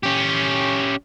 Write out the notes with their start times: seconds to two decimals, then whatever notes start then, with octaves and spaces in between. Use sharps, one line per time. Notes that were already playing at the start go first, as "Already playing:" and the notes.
0.03 C#4 G4